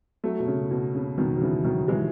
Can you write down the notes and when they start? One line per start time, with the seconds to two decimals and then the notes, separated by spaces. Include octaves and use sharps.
0.24 F#3 A3
0.40 B2
0.47 C#3
0.71 B2
0.95 C#3
1.18 B2 D#3
1.36 F#3
1.41 C#3 E3
1.65 D#3 F#3
1.88 E3 G#3